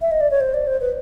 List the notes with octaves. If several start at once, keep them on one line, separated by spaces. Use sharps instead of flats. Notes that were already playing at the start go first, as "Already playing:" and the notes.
E5
D#5
D5
C#5
C5
D5
C5
B4